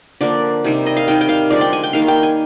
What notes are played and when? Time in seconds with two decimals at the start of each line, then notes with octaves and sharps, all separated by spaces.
0.21 D3 F3 A#3 D5
0.64 C3 D#3 G3
0.86 D#5
0.97 F5
1.08 C3 D#3 G3 G5
1.21 G5
1.29 F5
1.50 D3 F3 G#3 D5
1.61 G5
1.73 G#5
1.83 G5
1.93 D#3 G3 A#3 F5
2.08 G5
2.23 G#5